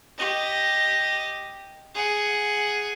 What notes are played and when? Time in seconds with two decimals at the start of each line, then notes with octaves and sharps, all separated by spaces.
0.18 G4 D#5
1.95 G#4 F#5